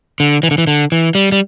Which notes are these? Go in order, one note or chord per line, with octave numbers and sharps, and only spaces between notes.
D3
E3
D3
E3
D3
E3
G3
G3